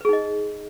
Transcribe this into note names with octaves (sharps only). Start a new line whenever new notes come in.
D#4 G#4 B4 D#5